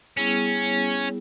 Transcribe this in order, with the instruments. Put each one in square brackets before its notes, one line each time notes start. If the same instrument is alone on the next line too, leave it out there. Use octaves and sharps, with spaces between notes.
[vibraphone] G3 B3 E4 G#4 [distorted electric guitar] C#4